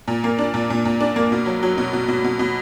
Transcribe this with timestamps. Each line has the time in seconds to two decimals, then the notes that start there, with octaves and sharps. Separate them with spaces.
0.08 A#2
0.24 A#3
0.39 D4
0.54 A#2
0.70 A#2
0.85 A#2
1.00 D4
1.16 A#3
1.32 B2
1.46 F#3
1.63 F#3
1.78 B2
1.93 B2
2.08 B2
2.24 B2
2.39 B2